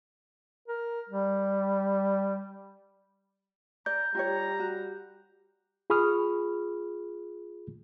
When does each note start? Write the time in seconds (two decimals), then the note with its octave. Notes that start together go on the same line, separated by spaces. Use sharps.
0.68 A#4
1.09 G3
3.86 D5 A#5 G6
4.15 G3 F4 G4 C#5 A#5
4.60 F#4
5.90 F4 G#4 B5 C#6 D#6 F6